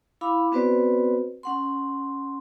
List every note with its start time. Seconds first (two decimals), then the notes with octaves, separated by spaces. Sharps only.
0.21 E4 F5 B5 D6
0.52 B3 C4 F#4 B4 C5 D5
1.43 C#4 F#5 C6